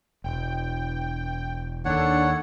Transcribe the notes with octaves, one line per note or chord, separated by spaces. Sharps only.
E1 G5
D#2 D4 A4 C#5 F#5